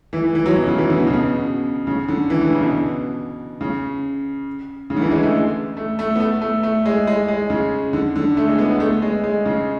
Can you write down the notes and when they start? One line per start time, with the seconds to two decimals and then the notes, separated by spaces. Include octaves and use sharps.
0.13 E3
0.24 E3
0.35 E3
0.46 F#3
0.56 B2
0.67 C#3
0.78 E3
0.90 D3
1.00 B2
1.07 C#3
1.14 B2
1.87 C#3
2.08 D3
2.30 E3
2.41 D3
2.51 C#3
2.63 B2
3.61 C#3
4.90 C#3
4.96 D3
5.02 E3
5.11 G#3
5.23 A3
5.77 A3
5.99 A3
6.15 B3
6.20 A3
6.41 A3
6.63 A3
6.86 G#3
7.07 G#3
7.28 G#3
7.50 C#3
7.93 D3
8.16 D3
8.37 A3
8.47 G#3
8.58 B3
8.69 B3
8.80 A3
9.02 G#3
9.24 G#3
9.45 C#3